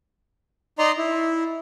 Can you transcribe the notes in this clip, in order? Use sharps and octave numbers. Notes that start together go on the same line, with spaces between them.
D#4 D5 D#5 A#5 C6
E4